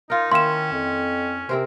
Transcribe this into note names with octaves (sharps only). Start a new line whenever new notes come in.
D#4 F4 A#4
D#3 A#3 C#4 E4 C6 E7
F2
C3 C4 A#4 C5